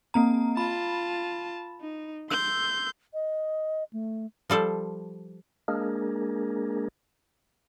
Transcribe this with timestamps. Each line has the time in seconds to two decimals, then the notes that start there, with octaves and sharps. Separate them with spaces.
0.14 A#3 C4 A#5
0.57 F4 A5 B5
1.80 D#4
2.30 C6 E6 G6
3.14 D#5
3.93 A3
4.50 F3 G3 A4 C5
5.68 G#3 A#3 D4 G#4 A#4